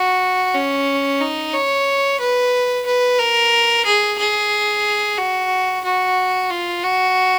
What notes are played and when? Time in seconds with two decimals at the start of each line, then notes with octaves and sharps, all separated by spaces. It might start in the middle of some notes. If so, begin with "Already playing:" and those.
Already playing: F#4
0.54 C#4
1.21 D#4
1.53 C#5
2.20 B4
2.86 B4
3.19 A#4
3.85 G#4
4.18 G#4
5.18 F#4
5.84 F#4
6.50 F4
6.83 F#4